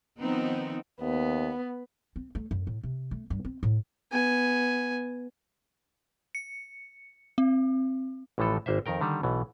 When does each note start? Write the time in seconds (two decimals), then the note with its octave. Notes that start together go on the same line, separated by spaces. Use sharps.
0.19 D#3 F3 B3 C4 D#4
1.01 D#2 B3
2.16 C4
2.35 A3
2.51 F#2
2.67 A2
2.83 C3
3.11 A3
3.30 G2
3.45 C4
3.63 A2
4.12 B3 G#5
6.35 C#7
7.38 C4
8.38 A1 A2 E3 F3 A4
8.66 G#1 A#3 C5 E5
8.86 F2 D#3 A#4 G5
9.01 D3 D#3 G3
9.23 B1 B2 E3